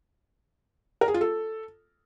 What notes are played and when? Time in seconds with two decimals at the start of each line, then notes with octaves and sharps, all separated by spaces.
1.01 A#4
1.08 G#4
1.14 F4
1.21 A4